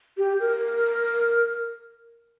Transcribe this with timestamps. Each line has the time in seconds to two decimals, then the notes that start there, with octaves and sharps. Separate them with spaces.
0.17 G4
0.40 A#4